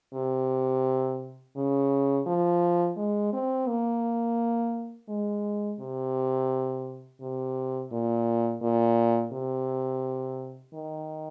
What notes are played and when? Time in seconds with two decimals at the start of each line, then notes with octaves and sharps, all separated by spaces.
0.14 C3
1.57 C#3
2.26 F3
2.97 G#3
3.33 C4
3.68 A#3
5.09 G#3
5.80 C3
7.21 C3
7.92 A#2
8.62 A#2
9.33 C3
10.74 D#3